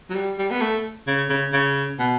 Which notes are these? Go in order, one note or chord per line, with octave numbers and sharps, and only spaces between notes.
F#3
G3
G3
B3
A3
C#3
C#3
C#3
B2